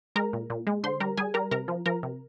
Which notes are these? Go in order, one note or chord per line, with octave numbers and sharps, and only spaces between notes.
G#3 A#4 A#5
A#2
A#2
G#3
D3 C5 C6
G3 A#4 A#5
G3 G#4 G#5
G3 A#4 A#5
C3 A#4 A#5
F3
F3 A#4 A#5
C3